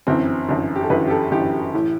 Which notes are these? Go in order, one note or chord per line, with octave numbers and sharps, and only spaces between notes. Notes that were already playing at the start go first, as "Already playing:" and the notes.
G1 F#2 E3 C4
G1 F#2 E3
G4
A4
G1 F#2 E3 B4
G4
A4
G1 F#2 E3 G4
A2 E3